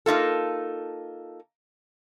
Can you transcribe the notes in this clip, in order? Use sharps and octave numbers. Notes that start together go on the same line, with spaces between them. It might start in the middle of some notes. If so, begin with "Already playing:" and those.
A#3 D#4 F4 A4